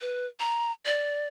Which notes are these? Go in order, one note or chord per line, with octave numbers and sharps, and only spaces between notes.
B4
A#5
D5